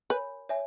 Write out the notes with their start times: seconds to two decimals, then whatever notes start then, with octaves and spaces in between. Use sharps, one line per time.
0.10 A#4 B4 C#5 G#5 B5 G6
0.49 C#5 E5 G#5